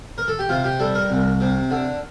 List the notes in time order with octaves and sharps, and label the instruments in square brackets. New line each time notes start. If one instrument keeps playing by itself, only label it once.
[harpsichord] A#4
A4
G4
C3 F4
G4
G3 A4
A#4
C2
C3
D3